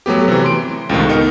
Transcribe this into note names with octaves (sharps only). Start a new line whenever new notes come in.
F#3 A3 B3 G4
C3 E3
C6 D7
C#2 A2 C3 D#3
B3 D#4 A#4